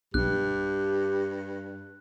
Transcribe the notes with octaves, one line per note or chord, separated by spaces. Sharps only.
B1 G2 G4 F#6